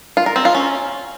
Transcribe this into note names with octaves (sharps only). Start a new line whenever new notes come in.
F4
A#4
C4
F4
C#4